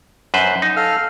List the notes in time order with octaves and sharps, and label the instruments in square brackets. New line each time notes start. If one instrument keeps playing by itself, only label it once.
[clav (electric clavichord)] F#2 B4 C5
D#4
[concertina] A4 F5 F6